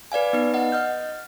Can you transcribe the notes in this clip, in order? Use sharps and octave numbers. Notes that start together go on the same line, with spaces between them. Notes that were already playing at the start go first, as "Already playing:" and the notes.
B4 D5 F5 G#5
B3 D#4 B4
D#5 F#5
D#5 F6 G6